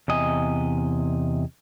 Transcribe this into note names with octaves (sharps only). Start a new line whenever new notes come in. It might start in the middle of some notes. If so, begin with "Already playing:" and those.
E2 C3 D#5 G#5